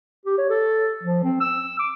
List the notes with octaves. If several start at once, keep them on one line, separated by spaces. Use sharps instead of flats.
G4
C#5
A4
F3
C4
E6
D6